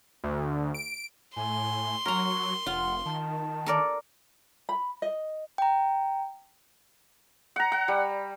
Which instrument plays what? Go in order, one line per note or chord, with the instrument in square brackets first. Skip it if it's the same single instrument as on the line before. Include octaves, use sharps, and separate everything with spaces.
[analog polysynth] D2
D7
[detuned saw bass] A2 [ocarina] G#5 [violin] C6
[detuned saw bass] F#3 [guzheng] A#4 A#5 [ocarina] C#6
[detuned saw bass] F1 [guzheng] F4 [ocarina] F#5
[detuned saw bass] D#3 [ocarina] A5
[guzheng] A4 A#4 D5
[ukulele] B5
D#5
[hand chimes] G5 A#5
[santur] F#5 A#5
F#5
G3